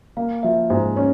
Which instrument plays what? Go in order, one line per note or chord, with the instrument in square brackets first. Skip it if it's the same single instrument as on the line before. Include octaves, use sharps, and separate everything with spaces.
[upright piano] A#3 [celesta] F5
[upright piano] F3 [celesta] E5
[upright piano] G#2 [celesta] C5
[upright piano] C#4 [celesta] C#5